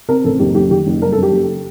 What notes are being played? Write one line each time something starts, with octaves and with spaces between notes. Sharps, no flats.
C4 A#4
A1 A4
F#1 G4
F#1 G4
D#3 G4
F#1
G3 A#4
A4
F#2
G4
F#1